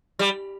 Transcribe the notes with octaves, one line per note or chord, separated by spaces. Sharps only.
G3